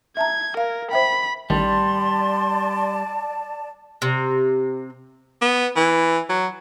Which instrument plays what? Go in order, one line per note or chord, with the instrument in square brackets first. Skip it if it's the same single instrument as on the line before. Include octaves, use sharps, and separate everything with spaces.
[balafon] E5 A5 A#5 [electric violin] G#6
[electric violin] A#4 [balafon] F5
[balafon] C5 E5 G5 [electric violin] B5
[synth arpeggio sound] A1 D#3 [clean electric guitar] G3 [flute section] D5 A5 [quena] C6
[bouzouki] C3
[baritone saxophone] B3
E3
F#3